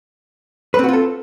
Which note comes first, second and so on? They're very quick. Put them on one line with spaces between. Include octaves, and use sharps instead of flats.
B4 C4 F#4 F4 A4